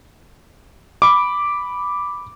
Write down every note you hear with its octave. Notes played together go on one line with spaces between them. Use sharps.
B5 D6